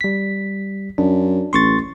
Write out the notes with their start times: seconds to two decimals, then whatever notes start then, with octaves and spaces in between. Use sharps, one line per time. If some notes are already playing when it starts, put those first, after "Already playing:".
0.01 G3 B6
0.98 F#2 D4
1.53 A1 C6 C#6 A6